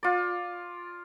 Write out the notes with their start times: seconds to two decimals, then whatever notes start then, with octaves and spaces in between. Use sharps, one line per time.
0.03 F4 D5